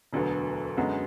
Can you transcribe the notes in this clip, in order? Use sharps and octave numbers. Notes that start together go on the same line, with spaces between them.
E1 D2 D3 F#3 B3
F#2 D3 G#3 B3 F#4